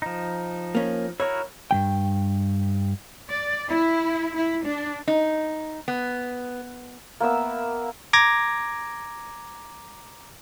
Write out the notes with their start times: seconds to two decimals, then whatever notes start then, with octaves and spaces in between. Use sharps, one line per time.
0.02 F3 D#4
0.75 A#3 C#4
1.20 E4 F#4 A#4 C#5
1.71 G2 G3 G5
3.29 D5
3.68 E4
4.35 E4
4.64 D4
5.08 D#4
5.88 B3
7.20 A#3 B3 E5 E6
8.13 A#5 D6 G#6 A#6